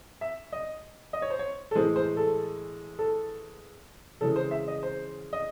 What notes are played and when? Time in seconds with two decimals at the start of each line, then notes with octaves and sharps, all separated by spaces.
0.21 E5
0.52 D#5
1.13 D#5
1.22 C#5
1.30 C5
1.39 C#5
1.71 A4
1.75 A2 E3 G#3 C5
1.96 C5
2.17 A4
2.99 A4
4.21 C#3 E3 G#3 A4
4.36 C5
4.51 E5
4.68 D#5
4.83 C5
5.33 D#5